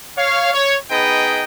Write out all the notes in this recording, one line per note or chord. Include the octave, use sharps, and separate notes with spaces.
C#5 F5
C#5
B3 D#4 G#4 B4 D#5 G5